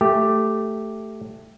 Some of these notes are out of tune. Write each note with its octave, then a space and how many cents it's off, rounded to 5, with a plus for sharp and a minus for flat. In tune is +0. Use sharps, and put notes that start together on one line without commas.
A3 +0 G4 +0